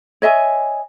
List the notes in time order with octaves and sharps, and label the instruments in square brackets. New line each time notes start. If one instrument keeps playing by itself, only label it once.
[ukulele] C#5 D#5 E5 G#5